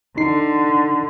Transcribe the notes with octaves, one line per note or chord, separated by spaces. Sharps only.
D3 D#4 C7